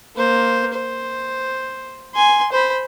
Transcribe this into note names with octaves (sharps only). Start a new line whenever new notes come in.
A#3 C5
C5
G#5 C6
C5 B5